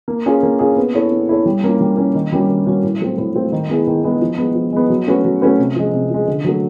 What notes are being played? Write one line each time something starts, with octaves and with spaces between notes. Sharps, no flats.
A#3
C#4 F4 G#4
A#3
C#4 F4 G#4
B3
E4 A4 C#5
B3
E4 A4 C#5
G3
A#3 C#4 F4
G3
A#3 C#4 F4
D#3
G3 A#3 C#4 F#4
D#3
G3 A#3 C#4 F#4
A2
F#3 A3 C4 F4
A2
F#3 A3 C4 F4
D#3
G#3 B3 E4 G#4
D#3
G#3 B3 E4 G#4
F3
G#3 B3
F3
G#3 B3
F#3
A3 C#4 F#4 B4
F#3
A3 C#4 F#4 B4
C3
F3 G#3
C3
F3 G#3
D3
F#3 A3